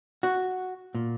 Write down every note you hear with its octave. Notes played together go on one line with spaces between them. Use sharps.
F#4
A#2